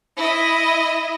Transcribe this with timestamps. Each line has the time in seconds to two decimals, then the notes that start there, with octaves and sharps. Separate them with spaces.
0.17 E4 D#5